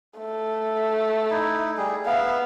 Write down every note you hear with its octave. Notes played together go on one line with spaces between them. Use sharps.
A3
D#4 E4
G3 G#4
B3 E5 F5